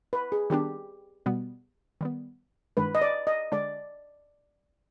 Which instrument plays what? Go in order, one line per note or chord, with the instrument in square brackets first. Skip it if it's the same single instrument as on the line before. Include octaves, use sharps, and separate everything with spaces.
[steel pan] B4
G#4
[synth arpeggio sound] D#3 G3 B3 D4 [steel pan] G4
[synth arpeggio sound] B2 G3 B3
D#3 G3 B3
[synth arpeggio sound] G2 D#3 G#3 D4 [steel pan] B4
[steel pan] D#5
D5
D#5
[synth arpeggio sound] D3 G#3 D4 [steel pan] D5